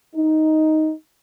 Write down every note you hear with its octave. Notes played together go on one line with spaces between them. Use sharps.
D#4